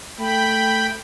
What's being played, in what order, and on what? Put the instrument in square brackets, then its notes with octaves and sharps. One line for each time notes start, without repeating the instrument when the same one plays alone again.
[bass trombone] A3 [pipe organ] G5 B5